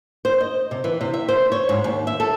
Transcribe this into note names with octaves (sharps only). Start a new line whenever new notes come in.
C5
D#5
C3
E3
C3
E5
C5
C#5
G#2
D#2
E5
A4